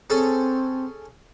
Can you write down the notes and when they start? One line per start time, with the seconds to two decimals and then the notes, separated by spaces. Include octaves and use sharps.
0.10 C4 C#4 G#4 A4